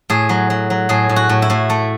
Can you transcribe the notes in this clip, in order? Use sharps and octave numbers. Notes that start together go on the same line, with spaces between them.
A2 G#4
F#3
F#3
F#3
A2 G#4
A2
F#4
A2
E4
A2
A3